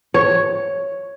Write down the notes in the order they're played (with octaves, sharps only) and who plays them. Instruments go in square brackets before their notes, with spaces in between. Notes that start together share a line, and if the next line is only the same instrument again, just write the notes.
[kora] C#5